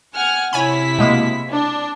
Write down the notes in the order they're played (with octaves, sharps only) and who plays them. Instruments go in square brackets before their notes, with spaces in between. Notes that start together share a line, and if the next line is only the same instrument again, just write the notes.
[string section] F#5 G#5 F6
[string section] C3 E4 B6 [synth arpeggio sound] C#5 G#5 B5
[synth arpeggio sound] B2 G#3 A#3
[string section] D4